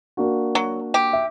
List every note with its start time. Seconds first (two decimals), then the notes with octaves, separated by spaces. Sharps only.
0.17 A#3 D4 F#4
0.55 F#3
0.94 G4
1.13 E5